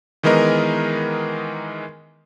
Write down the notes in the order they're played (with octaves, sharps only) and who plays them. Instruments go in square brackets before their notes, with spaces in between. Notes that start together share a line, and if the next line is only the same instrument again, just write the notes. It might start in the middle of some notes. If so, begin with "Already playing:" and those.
[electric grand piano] D#3 E3 G#3 B3 A#4 D#5